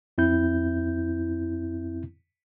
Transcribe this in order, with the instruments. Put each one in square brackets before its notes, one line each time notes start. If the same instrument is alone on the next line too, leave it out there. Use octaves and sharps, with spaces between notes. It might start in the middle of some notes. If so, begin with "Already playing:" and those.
[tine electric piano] F2 C4 E4 G6